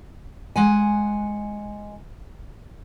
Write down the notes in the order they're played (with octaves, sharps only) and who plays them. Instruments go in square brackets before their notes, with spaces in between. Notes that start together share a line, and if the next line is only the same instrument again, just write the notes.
[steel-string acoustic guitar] G#3 F#5 G#5